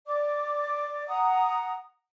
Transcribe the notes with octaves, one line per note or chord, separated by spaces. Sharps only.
D5 D6
F#5 A#5 D#6